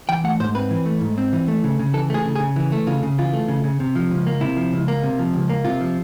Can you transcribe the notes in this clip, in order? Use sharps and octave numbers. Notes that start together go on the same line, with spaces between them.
E3 G5
A3 F#5
G#2 C5
C4 B4
E3
A3
G#2
C4
E3
A3
C#3
C#3
E3 A4
A3 G#4
C#3
G#4
C#3
E3
A3
C#3 F4
C#3
E3 F4
A3
C#3
C#3
C3
F3
C#2
A#3
C3 E4
F3
C#2
A#3
C3
F3
C#2
A#3
C3 F4
F3